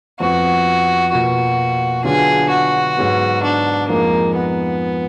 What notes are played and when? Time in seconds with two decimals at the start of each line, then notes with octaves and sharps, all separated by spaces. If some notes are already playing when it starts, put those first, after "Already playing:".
0.20 F2 F3 B3 F#4
1.12 B2 A#3 F4 F#4
2.04 D3 F#3 B3 D4 F4 G#4
2.50 F#4
2.97 G#2 F#3 B3
3.43 D4
3.89 F2 F3 G#3 A#3 D#4
4.35 B3